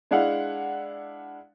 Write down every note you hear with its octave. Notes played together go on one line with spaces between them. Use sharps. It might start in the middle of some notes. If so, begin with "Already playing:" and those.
G#3 D4 E4 F5 F#5